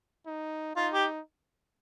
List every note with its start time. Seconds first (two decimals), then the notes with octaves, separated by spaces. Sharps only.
0.27 D#4
0.76 D#4 F4
0.93 G4